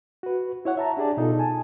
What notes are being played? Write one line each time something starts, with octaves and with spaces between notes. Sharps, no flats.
F#4 B4
E4 C#5 F#5
E5 A5 A#5
D4 G4 G#4 D5 A5
B2 D#4 F4 A4
G#5 A5